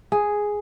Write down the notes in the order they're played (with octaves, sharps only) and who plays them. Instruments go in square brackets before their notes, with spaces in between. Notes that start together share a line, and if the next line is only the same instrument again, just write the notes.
[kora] G#4